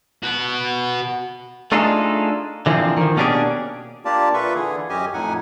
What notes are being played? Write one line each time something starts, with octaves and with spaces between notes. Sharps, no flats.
F#4 B4
A3 D4 D#4 F4 G#4 A4
D3 E3 F3 G3 A#3 C4
D#3 F3
B2 A#3 C#4 D4 G4 G#4
A#3 D4 F4 G4 D5 A5
A#2 F4 A4 B4 E5 C#6
D3 E3 G#4
F#2 C#4 G4 D#5 G#5
F2 A2 D#4 F#5 G#5